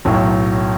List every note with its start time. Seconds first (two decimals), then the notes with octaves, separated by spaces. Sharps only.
0.05 B1 A2 F#3